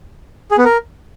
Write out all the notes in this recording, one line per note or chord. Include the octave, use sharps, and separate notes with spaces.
G#4
B3
A#4